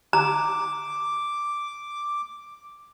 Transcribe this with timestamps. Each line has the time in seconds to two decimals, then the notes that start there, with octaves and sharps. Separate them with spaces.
0.13 A#5 D6